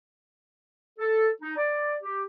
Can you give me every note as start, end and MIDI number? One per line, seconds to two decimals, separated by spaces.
0.99 1.28 69
1.42 1.56 63
1.57 1.96 74
2.03 2.24 67